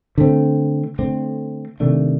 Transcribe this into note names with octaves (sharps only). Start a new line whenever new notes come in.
D3 A3 C4
D3 A3 C4
C3 D#3 A3 D4